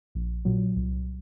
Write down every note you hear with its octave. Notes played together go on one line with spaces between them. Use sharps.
A#1
A#2 F#3
C2